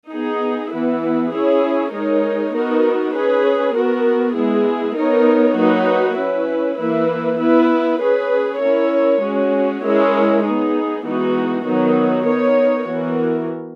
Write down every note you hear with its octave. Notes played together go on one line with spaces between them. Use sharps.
B3 D#4 G#4
E3 B3 E4 B4
C#4 E4 G#4 C#5
G#3 D#4 A#4 C#5
B3 D#4 F#4 A#4
C#4 G#4 B4
B3 F#4 A#4
G#3 B3 E4 G#4
B3 D#4 A#4 C#5
F#3 A#3 D#4 F#4 B4
C#4 E4 B4
E3 A#3 E4 B4
B3 E4 B4
C#4 G#4 B4
C#4 E4 A#4 C#5
G#3 C#4 F#4
G#3 C#4 E4 A#4 C#5
B3 D#4 G#4
E3 G#3 B3 D#4 F#4
D#3 F#3 B3 D#4 F#4
B3 D#4 A#4 C#5
E3 B3 F#4 A#4